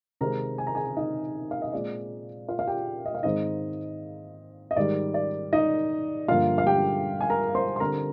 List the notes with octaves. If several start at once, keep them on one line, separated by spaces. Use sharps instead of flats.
C3 D#3 G#3 C4 A#4 A#5
G#5
A#5
G#4 G#5
D#4 D#5
F5
D#5
A#2 G#3 C4 D5
F4 F5
F5
G4 G5
D#5
F5
G#2 D#3 G#3 C4 D#4 D#5
D#5
G#2 D#3 G3 D5
D5
D#4 D#5
G2 D3 F3 A#3 F4 F5
F5
G4 G5
G#5
A#4 A#5
C5 C6
C6
D3 G3 C4 A#4 A#5